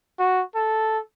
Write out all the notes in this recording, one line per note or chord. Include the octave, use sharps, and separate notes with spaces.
F#4
A4